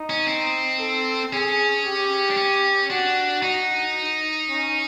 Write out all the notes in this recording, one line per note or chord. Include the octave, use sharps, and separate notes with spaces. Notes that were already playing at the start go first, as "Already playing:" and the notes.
Already playing: D#4
C#4
C4
A4
C#4 G#4
G4
D4
C#4
D4 F#4
D#4 F#4
C#4